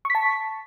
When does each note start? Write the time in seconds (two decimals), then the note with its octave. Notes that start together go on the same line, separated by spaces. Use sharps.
0.05 C#6
0.10 B6
0.15 A5